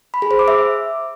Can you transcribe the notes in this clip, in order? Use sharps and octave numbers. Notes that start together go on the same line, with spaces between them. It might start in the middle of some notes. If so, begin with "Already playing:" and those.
B5
G#4
C5
D6
E5